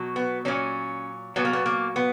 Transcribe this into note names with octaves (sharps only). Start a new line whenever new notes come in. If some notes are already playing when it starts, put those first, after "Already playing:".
Already playing: B2 F#3
B3
A#2 F#3 C#4
A#2 F#3 B3
A#3
B3
A#3
B3